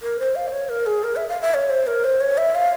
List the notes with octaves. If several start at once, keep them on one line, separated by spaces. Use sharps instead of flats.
A#4
C5
F5
C5
C#5
A#4
G#4
A#4
E5
F5
E5
C#5
C5
A#4
C5
C#5
E5
F5